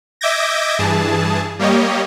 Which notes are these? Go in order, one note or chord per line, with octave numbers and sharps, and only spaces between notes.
D#5 E5 D6 G6 G#6 A#6
G2 E3 G#4 A5
G3 A#3 G4 C#5 D#5